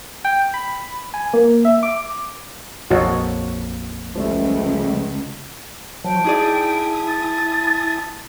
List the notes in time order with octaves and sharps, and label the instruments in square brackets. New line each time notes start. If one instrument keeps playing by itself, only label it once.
[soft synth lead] G5
B5
G#5
A#3
E5
D6
[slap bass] A#1 F2 [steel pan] F#4 C#5 D#5
[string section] C#2 [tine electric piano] F3 G3 A3
[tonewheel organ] F3 F#3 [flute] G5 [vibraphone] A5
[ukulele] D#4 G#4 D5 [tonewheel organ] E4 G#5 D#6
[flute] A6